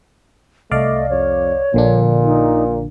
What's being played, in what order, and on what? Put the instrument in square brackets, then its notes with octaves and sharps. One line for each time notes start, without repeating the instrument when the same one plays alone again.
[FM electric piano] C2 D5 F5 [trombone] A3 [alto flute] D#5
[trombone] F2 [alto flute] C#5
[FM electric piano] A#1 D3 D4 [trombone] A#2
[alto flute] D#4